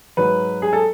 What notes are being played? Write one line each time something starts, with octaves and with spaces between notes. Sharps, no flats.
G#2 F#3 B4
G#4
A4